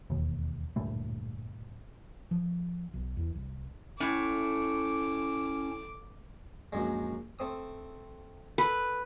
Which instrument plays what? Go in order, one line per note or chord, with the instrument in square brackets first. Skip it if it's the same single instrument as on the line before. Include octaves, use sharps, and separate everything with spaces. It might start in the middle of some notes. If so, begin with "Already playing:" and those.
[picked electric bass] E1 D#2
D1 G2 A#2 A3
[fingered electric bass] F3
B1
E2
C2
[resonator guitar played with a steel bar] A2 [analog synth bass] C#4 [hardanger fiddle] D6
[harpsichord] A#1 F#2 G#3
A3 C4 D#6
[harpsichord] A4 [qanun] B4